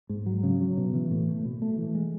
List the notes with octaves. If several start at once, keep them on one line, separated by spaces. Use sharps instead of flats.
G#2
F#3
C#3
F#3
B2
E3
A2
A3
B2
A3
E3
G#3